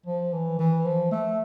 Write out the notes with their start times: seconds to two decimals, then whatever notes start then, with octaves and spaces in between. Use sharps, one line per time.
0.06 F3
0.33 E3
0.59 E3
0.85 F3
1.11 A3